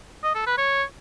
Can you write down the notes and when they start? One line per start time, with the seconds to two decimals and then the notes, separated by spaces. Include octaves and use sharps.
0.24 D#5
0.35 A4
0.46 B4
0.58 C#5